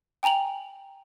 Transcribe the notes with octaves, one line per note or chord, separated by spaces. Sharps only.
G5 G#5 A#5 F7 F#7